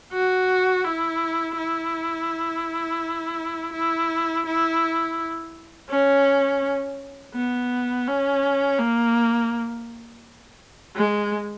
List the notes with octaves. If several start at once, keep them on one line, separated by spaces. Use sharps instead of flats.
F#4
E4
E4
E4
E4
C#4
B3
C#4
A#3
G#3